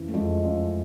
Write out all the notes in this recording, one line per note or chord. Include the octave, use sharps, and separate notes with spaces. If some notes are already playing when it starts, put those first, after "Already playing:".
Already playing: F2 C#3 E3
A3
F2 G#3
F2